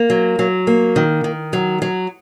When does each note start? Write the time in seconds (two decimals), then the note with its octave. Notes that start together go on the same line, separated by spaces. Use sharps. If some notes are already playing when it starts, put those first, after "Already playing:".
Already playing: A#3
0.10 F#3
0.39 F#3
0.67 A#3
0.96 D#3
1.24 D#3
1.53 F#3
1.82 F#3